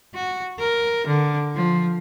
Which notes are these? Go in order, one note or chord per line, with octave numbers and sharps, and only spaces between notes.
F#4
A#4
D3
F3